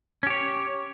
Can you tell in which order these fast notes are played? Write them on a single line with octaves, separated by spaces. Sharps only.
C#4 G4 C#5